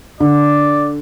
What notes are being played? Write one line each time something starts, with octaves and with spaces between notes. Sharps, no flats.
D3 D5